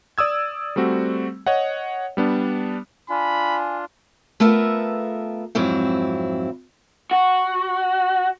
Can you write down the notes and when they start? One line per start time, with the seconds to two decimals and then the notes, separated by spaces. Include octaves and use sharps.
0.18 D5 D#6 E6 G#6
0.76 G3 A3 C4 F#4
1.47 C#5 D#5 F#5
2.17 G3 B3 D4
3.09 D4 F4 G#5 B5
4.40 A3 B3 F4 A#4 E5
5.55 F2 G#2 F#3 C4 E4
7.11 F#4